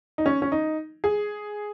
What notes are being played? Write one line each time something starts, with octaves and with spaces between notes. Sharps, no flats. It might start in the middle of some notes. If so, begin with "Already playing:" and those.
D#4
C#4
C#4
D#4
G#4